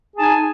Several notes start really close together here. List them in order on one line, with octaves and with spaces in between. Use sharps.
G#4 A5 D#4 G#5